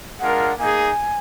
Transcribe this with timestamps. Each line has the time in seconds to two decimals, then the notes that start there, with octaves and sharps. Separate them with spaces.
0.20 G#3 D4 F4 A#4 F#5
0.58 A#3 D#4 G#4 G#5